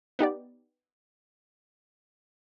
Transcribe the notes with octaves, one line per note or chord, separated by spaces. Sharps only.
B3 D#4 G4 D5